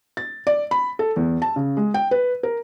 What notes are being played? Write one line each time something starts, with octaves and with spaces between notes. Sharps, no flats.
A6
D5
B5
A4
E2
A5
C#3
G#3
G5
B4
A#4